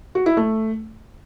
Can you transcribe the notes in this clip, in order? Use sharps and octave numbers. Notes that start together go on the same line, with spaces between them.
F#4
E4
A3